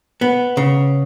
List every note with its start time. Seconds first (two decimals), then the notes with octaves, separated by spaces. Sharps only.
0.21 B3
0.57 C#3